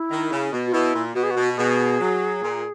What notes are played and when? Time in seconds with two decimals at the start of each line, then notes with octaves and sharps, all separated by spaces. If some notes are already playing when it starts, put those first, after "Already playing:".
Already playing: E4
0.11 D#3
0.31 C#3
0.52 B2
0.67 F#4
0.73 B2 E4
0.95 A#2
1.15 B2 F#4
1.23 G#4
1.31 F#4
1.37 B2
1.57 B2 G#4
2.00 F#3
2.42 A#2